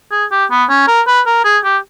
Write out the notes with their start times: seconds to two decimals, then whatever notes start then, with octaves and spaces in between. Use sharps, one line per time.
0.12 G#4
0.31 G4
0.51 B3
0.70 C#4
0.88 A#4
1.07 B4
1.27 A#4
1.45 G#4
1.64 G4